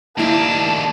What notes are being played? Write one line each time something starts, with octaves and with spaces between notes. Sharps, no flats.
D#2 A#3 D4 E4 D#5 A5